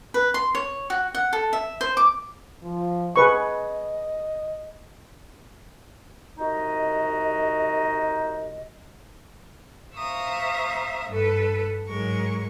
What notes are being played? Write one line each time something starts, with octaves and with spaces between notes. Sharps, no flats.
B4
C6
C#5
F#4
F#5
A4
E5
C5
D6
F3
G#4 B4 D#5 C#6
C2 D#4 F#4 D#5
C5 E5 F5 A#5 C#6 D#6
G2 A4 B4
G#2 F#3 G#3 A#4 C#6